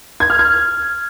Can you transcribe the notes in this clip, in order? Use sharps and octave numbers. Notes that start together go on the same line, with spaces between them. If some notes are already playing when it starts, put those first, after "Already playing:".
G#6
F6
G#6